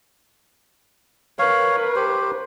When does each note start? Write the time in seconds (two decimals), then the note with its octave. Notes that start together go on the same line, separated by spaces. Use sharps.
1.39 A#4 B4 C#5 F5
1.95 G4 C5